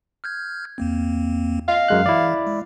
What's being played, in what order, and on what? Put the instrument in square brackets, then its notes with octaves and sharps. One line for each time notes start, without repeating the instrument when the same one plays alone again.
[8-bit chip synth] F6 G6 G#6
E2 A#3 C4
[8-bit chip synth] D#5 [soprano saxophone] F5
[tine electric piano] F#2 G#3 F#6
[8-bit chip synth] E3 [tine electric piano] E4 D5
[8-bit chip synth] G#3